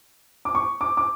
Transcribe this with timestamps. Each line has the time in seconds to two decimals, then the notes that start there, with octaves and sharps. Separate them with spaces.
0.45 D6
0.55 C#6
0.81 D6
0.97 D6